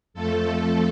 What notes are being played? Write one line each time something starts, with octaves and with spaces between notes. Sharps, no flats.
F2 F3 A3 A4